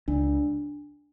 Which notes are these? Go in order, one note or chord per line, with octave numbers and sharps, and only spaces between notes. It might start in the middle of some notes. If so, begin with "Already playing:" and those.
C#2 D4